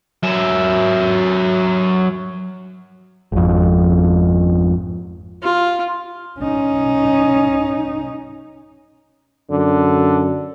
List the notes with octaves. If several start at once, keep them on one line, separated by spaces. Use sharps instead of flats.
F#3 E5
G#1 F2
F4
C#4 D#4
F#2 D3